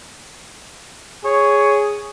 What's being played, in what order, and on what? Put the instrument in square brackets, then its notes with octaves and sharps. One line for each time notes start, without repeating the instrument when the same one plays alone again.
[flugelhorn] G#4 [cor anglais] C#5